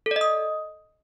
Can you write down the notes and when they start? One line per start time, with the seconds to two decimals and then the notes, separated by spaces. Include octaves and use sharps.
0.06 A4
0.11 D5
0.16 D#5
0.21 D#6